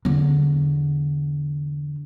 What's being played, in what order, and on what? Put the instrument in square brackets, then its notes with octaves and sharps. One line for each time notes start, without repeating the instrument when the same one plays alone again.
[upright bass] E2 D3